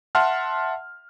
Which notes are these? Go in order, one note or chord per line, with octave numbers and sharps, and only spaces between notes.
E5 F#5 A5 C6 F6